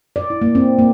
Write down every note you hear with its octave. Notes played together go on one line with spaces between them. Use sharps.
D5
E4
A#3
C4
A#3